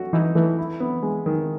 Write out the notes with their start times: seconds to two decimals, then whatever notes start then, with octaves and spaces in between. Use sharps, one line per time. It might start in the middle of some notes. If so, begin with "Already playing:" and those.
Already playing: A3 F#4
0.13 E3 D#4
0.35 E3 A3
0.58 E4
0.80 B3
1.03 G#3
1.26 D#3